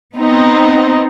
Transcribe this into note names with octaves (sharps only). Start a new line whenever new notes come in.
B3 C4 D#4